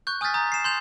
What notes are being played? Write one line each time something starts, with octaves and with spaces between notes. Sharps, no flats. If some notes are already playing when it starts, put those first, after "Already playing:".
C#6 F#6 G6
G#5 D#6 F6 G6 A6 B6
A#5 D#6 G6
C7 E7
C6 G6 F7